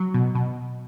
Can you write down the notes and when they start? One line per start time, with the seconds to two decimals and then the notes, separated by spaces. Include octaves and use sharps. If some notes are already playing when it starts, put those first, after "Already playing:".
Already playing: F#3
0.14 B2
0.35 B2